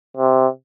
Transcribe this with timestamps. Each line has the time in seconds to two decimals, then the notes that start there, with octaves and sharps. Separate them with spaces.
0.17 C3